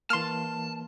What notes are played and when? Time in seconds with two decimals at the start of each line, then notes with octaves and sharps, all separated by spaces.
0.10 E3 A#3 A5 C6 F6